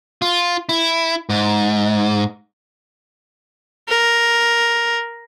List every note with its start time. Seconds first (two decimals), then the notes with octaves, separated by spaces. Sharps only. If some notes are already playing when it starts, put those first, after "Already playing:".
0.22 F4
0.69 E4
1.30 G#2
3.88 A#4